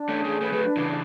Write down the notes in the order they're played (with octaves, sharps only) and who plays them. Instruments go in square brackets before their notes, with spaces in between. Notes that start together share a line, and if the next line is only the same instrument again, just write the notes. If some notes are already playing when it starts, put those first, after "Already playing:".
Already playing: [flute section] D4
[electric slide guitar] A3 C#4
[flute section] G#4
[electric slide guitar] A3 C#4
[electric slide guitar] A3 C#4 [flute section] B4
[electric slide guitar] F#3 A3
[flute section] D4
[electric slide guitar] C#3 E3